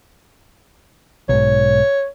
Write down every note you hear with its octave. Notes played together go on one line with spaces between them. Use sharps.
B1 G#2 C#5